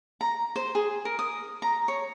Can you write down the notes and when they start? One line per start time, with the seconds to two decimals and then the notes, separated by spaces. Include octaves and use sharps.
0.21 A#5
0.56 C5
0.75 G#4
1.05 A#4
1.19 D#6
1.62 A#5
1.88 C#5